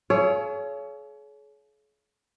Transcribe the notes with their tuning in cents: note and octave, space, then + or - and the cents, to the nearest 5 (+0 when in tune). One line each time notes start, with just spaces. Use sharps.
G#4 +45 C#5 +25 F5 -40